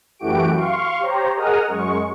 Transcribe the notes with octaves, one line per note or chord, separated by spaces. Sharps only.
F#2 E3 A3 F#4 G4 D7
F5 C6 C#6
G4 C5 C#5 A#5
G#4 A#4 D#5 F#5 D#6 F6
F#2 G#3 C#6